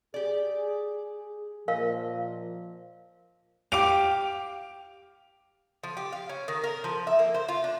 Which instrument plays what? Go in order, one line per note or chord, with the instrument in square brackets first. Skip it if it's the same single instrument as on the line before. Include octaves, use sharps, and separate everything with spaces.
[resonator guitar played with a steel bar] G4 D5 [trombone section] G#4
[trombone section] A#2 F3 [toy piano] A#4 F5 [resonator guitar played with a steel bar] D#5
[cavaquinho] G4 F5 [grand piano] D6 D7 F7
[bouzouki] F3
G4
F5
C#4
D#3
A#4
F3
E5
A#3
C5
F4
D4